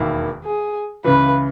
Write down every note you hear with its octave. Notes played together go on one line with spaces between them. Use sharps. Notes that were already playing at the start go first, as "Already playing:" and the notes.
Already playing: E1 D#2 D#3 A#3 E4
G#4
C#2 C#3 E3 B4